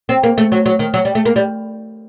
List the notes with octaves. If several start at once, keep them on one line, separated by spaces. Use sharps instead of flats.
C4
A#3
A3
F#3
F#3
D#3
F#3
G3
A3
A#3
G3